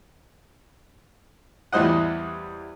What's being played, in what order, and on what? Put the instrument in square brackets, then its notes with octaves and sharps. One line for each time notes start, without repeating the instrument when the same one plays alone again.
[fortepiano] E2 E3 G3 C5 D#5 F#5